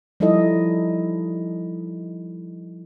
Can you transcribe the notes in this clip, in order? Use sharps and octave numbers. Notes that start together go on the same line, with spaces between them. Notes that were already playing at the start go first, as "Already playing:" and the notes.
F3 G3 D#4 E4 A4 D#5